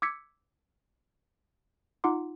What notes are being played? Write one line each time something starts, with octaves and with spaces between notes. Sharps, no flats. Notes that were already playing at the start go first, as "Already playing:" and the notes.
D6 E6 G#6 B6 C#7
D#4 F4 F#5 C6 D6